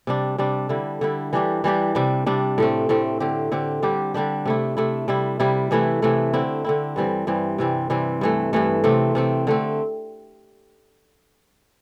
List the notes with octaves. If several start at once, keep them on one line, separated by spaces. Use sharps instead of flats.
C3 G3 D4
C3 G3 D4
D3 G3 E4
D3 G3 E4
E3 G3 D4 G4
E3 G3 D4 G4
C3 G3 D4
C3 G3 D4
A2 A3 C4
A2 A3 C4
D3 C4 G4
D3 C4 G4
D3 G3 D4 G4
D3 G3 D4 G4
C3 A3 E4
C3 A3 E4
C3 G3 E4
C3 G3 E4
C3 E3 A3 E4
C3 E3 A3 E4
D3 C4 E4
D3 C4 E4
G2 E3 G3 C4
G2 E3 G3 C4
C3 E3 G3 C4
C3 E3 G3 C4
G2 E3 A3
G2 E3 A3
C3 A3 C4
C3 A3 C4
D3 A3 C4